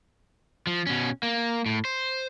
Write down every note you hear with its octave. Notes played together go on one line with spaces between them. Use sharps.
F3
B2 C#4
A#3
A2
C5